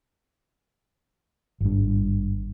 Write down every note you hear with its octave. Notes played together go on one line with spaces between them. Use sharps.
G#1 G2